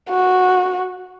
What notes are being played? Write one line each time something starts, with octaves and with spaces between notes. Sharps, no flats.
F#4